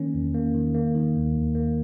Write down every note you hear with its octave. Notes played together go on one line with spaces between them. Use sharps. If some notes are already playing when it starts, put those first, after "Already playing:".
Already playing: D#3 A#3 C#4
E2
A#3
D#3
A#3
D#3
D#2
D#2
A#3